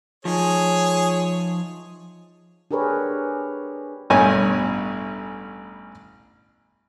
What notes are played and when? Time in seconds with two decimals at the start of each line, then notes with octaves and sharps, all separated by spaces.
0.25 F3 D#4 G#4 C#5
2.71 D4 G4 G#4 A#4 B4 C#5
4.10 A1 G2 B2 C#5 G#5